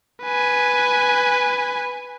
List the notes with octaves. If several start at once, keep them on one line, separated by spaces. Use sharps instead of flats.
B4 G#5